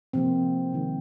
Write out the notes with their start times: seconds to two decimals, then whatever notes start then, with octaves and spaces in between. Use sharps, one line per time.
0.13 C3 F3 A#3 C4
0.72 C3 D#3 G#3